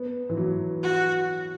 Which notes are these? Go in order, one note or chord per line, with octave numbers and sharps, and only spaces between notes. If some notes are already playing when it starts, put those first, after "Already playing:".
Already playing: B3
E3
F#3
F#4